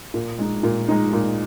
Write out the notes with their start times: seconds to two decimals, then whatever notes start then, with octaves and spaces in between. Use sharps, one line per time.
0.14 A#2
0.39 G#3 D#4
0.63 A#2
0.88 G#3 D#4
1.13 A#2